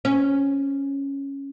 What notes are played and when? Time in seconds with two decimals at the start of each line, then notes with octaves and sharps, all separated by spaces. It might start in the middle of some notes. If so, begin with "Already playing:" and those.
0.05 C#4